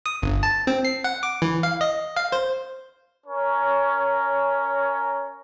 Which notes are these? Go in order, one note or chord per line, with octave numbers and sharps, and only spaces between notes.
D#6
G1
A5
C4
C7
F#5
D6
E3
F5
D#5
F5
C5
C#4 A#4 C#5